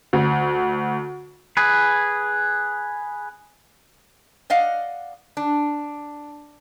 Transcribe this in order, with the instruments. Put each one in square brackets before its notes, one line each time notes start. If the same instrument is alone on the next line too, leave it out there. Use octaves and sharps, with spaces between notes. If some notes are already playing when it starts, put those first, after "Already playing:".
[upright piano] D2
[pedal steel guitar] G#4 B4
[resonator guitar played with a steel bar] D5 D#5 F5 F#5
D4